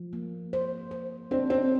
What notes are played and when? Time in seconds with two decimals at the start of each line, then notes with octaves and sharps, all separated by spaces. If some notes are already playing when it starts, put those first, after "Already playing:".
Already playing: F3
0.13 A#3
0.53 C5
0.91 C5
1.31 C4 D4
1.50 C4